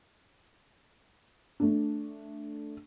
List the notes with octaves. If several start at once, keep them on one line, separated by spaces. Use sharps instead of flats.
A3 D4